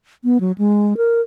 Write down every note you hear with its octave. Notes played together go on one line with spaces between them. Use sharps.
B3
F#3
G#3
A#4